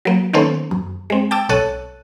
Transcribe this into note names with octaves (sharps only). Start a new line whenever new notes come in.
F#3 A#3
D#3 A#3 B3 C#4 A4 C5
F#2
G#3 C4
G5 A5 D6 E6
B1 A4 C#5 A5 F#6 D#7